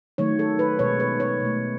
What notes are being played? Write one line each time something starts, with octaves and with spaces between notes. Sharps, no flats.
D#3 F#3 A3 C#5
A4
B4
B2 G#3 C#5
B4
C#5
B2 A3